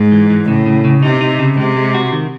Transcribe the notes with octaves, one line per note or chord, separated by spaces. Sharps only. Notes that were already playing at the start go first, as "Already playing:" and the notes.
Already playing: G#2
E3
E3
A2 C#3
C#3
C#3
C3 D#4
D#4
C#3
C3 G#3
G#3
F#4
D#3